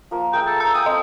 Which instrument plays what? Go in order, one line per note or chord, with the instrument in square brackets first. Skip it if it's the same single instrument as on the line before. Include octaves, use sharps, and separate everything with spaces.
[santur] F3 A#3
[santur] G#4 A#4 E5 [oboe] G5 [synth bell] A#5
[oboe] A4
[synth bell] A#5 E6
[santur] F5 G5 G#5 [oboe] D#6
[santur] C4 A4 [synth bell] D#5